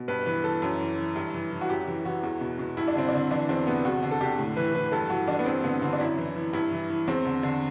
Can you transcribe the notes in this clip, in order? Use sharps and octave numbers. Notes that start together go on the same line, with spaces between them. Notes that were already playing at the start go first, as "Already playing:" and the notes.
Already playing: B2
G2 B4
E3 B4
E3 A4
F#2
E3
E3
G2
E3
E3
F#4
F#2 G4
E3
E3 F#4
E2
B2
B2
G2 E4
D4
D3 C4
D3 D4
E3 D4
E2 C4
C3 B3
E2 F#4
D3
A4
D3 G4
A2
E3 B4
E3 B4
G2 A4
E3 F#4
E3 D4
B3
G2 C4
D3 B3
D3 C4
D4
F#2 E4
E3
E3
G2 E4
E3
E3
E2 C4
D3
D3